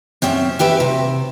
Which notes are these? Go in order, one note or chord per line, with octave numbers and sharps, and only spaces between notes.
F#2 C4 C#4 E5
F#4 G4 B4 E5
C3